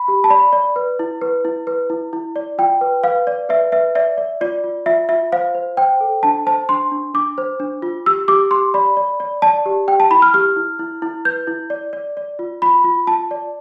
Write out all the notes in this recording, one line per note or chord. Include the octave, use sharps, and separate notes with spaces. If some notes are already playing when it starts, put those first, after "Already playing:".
Already playing: B5
G4
A5
D5 B5
D5
B4
E4
B4
E4
B4
E4
E4
D5
F4 G5
B4
B4 F5
D5
B4 E5
B4 E5
D5 E5
D5
F4 D5
F4
F4 E5
F4 E5
C5 F5
C5
C5 G5
A4
D4 A5
C5 A5
D4 C6
D4
D4 D6
C5
D4
F4
G4 E6
G4 D6
G4 C6
D5 B5
D5
D5
D5 A5
G4
G4 G5
A5
E4 B5
F6
G4 F6
E4
E4
E4
B4 G6
E4
D5
D5
D5
F4
F4 B5
F4
F4 A5
D5